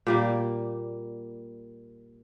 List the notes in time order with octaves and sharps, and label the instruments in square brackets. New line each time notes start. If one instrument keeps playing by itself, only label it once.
[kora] A#2 G3 A#3